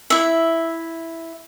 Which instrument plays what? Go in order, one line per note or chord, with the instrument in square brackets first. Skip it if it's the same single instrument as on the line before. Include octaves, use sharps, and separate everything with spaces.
[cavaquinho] E4 E5